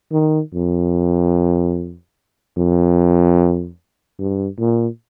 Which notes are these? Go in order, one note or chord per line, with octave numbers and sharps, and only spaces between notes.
D#3
F2
F2
G2
A#2